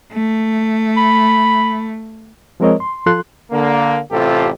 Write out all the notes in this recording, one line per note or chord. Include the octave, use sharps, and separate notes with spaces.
A3
B5
F3 G#3 C4 A#4 C#5 D#5
C6
F3 F4 A4 C6 F#6
D3 A#3
A1 C3 F4 G4 A4